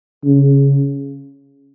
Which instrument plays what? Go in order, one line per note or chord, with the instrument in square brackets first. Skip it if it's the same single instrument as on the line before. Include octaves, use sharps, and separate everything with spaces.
[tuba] C#3